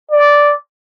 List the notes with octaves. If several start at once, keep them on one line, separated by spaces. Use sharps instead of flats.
D5